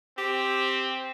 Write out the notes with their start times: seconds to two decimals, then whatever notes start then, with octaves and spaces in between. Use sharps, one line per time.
0.18 C4 G4